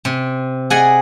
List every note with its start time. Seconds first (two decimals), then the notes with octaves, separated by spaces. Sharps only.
0.05 C3
0.70 G#4 D5 D#5 F#5 G#5